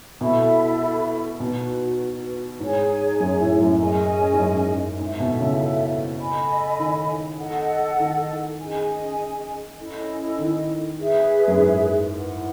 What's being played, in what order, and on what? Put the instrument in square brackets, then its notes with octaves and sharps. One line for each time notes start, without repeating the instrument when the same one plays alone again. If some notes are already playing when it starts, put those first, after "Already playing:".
[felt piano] B2 [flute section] E4 A4 E5 B5
[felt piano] B2 [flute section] D#4 F#4 B4
[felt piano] G#2 [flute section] D#4 G#4 C#5 G#5
[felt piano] F#2
A2
F#2
[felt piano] F#2 [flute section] C#4 G#4 D#5 G#5
[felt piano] G#2
F#2
[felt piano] G#2 [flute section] D#4 A4 E5
[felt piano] B2
C#3
[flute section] A4 D#5 G#5 B5
[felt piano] D#3
[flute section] A4 D#5 F#5
[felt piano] D#3
[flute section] C#4 G#4 D#5 G#5
C#4 E4 A4 D#5
[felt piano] D#3
[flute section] G#4 B4 E5
[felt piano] F#2
G#2
[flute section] E4 B4 F#5